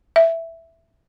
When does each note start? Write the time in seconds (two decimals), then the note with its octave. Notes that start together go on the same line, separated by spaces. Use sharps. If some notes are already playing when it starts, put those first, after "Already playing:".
0.16 E5